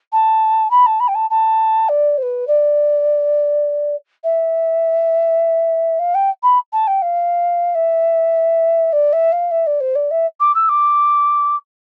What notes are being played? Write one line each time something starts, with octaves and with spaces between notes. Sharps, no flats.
A5
B5
A5
B5
G5
A5
A5
D5
C5
B4
D5
E5
F5
G5
B5
A5
G5
F5
E5
D5
E5
F5
E5
D5
C5
D5
E5
D6
E6
D6